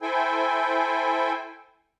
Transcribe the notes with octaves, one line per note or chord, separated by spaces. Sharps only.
E4 A4 C5 G5 G#5